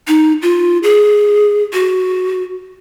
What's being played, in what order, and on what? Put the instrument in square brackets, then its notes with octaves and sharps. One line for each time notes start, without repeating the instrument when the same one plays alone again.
[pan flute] D#4
F4
G#4
F#4